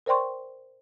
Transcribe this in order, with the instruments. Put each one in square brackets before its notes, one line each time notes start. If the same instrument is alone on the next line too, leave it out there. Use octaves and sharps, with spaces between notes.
[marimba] A#4 C5 D5 G5 C6 C#6